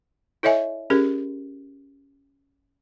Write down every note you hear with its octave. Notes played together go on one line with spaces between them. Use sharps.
E4 A4 C#5 D#5 E5 G#5
C#4 G4 G#4 A#4